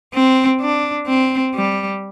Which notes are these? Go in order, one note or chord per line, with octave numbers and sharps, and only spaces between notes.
C4
D4
C4
G3